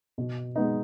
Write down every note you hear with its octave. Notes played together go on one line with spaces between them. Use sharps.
B2
G#3 B3 D#4